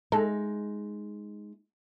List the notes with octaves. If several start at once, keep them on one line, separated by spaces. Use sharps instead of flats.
G#3 D#4 A4